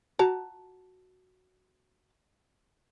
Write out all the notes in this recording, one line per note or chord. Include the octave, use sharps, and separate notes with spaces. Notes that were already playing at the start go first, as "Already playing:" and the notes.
F#4 A5 A#5